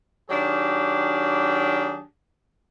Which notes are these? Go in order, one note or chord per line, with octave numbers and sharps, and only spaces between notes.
D#3 F#3 D4 G4 G#4